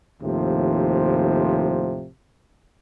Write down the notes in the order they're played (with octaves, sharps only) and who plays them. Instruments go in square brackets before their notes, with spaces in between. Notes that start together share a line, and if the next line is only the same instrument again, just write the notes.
[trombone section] D#2 A2 C3 F3